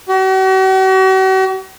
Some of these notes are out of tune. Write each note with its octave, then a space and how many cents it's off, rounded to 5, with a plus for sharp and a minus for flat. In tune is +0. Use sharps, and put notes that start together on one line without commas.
F#4 +45